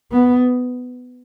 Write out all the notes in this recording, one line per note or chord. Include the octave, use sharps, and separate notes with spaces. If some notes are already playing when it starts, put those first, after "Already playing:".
B3